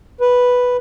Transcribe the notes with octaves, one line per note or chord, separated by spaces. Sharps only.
B4